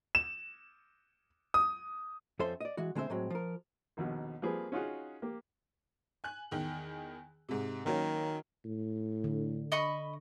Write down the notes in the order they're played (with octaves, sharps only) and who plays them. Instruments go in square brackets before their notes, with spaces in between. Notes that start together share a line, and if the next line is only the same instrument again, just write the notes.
[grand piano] E7
D#6
[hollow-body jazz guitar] F2 C#4 A4 C5 E5 C6
D5 D#5
E3 G#3 F#4
D3 G#3 C4 C5 E5
A2 F#3 G#3 C4
F3 A#4
[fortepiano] A#1 D#2 B2
F3 G3 A#3 C4 G#4 B4
C#4 D#4 F4 F#4 G#4 F#5
A#3 G4
[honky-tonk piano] G#5 F#6 F#7
E2 D#3 G5
G#2 C3
[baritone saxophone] D#3 [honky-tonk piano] F#3 A#3 C#4
[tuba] A2
[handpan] D3
[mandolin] D#5 B5 C#6